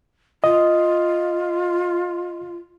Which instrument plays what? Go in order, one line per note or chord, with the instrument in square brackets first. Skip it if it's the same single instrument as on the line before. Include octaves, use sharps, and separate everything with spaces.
[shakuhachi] F4 [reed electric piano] D#5